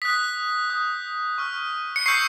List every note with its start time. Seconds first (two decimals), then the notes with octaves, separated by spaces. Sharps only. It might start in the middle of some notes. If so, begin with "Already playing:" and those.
0.02 D#6 F#6 B6
0.70 D#6 G6
1.38 C#6 F6
1.96 C#7
2.06 C#6 E6 G6 C7